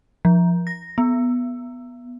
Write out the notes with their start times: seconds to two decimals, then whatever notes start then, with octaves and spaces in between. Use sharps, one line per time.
0.25 F3
0.67 A#6
0.98 B3